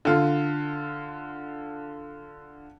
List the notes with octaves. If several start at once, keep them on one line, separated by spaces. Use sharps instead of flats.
D3 F4